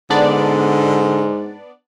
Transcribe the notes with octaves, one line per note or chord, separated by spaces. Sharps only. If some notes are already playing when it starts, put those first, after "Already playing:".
G#2 D3 B3 D4 D5